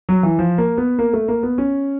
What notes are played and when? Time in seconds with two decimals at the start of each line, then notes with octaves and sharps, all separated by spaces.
0.09 F#3
0.23 E3
0.39 F3
0.58 A#3
0.78 B3
0.99 A#3
1.13 A3
1.28 A#3
1.43 B3
1.58 C#4